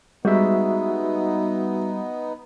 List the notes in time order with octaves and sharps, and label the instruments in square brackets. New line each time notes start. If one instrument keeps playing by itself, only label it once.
[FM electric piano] G3 [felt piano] G#3 [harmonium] B3 D#4 [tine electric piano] F#4 E5